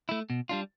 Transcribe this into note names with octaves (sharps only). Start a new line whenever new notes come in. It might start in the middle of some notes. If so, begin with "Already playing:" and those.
A3 E4
B2
G3 D4 F4